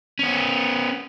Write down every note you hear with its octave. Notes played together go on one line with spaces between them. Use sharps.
B3 C#4